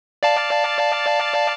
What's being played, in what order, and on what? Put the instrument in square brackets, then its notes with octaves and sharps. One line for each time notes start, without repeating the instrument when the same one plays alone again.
[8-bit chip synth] D5 F5 A5